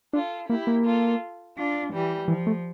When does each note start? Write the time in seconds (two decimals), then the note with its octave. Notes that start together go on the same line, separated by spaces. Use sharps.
0.13 D4 F4 A4
0.48 A#3 E4 G4
0.67 A#3
0.85 F4 A4
1.56 D4 F4
1.93 E3 G3
2.28 E3 F3
2.47 A3